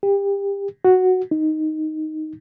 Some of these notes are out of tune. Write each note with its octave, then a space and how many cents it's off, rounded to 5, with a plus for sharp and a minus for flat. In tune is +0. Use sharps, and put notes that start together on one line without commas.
G4 +25
F#4 +0
D#4 +0